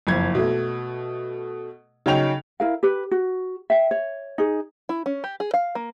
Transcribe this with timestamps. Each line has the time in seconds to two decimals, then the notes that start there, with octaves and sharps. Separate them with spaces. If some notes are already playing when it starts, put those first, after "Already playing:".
0.07 F#1 F2 G#6
0.35 B2 A3
2.06 C#3 F#3 C#4 D#4 G5 F7
2.60 E4 A#4 F5
2.83 G4 B4
3.11 F#4
3.70 E5 G5
3.91 C#5
4.38 D#4 G#4
4.89 E4
5.06 C#4
5.24 G4
5.40 G#4
5.54 F5
5.75 A#3